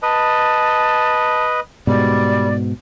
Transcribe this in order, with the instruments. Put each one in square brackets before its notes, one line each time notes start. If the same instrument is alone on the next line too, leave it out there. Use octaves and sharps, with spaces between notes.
[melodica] B4 D#5 [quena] A5
[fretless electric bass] G#2 B2 [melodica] G3 [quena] D5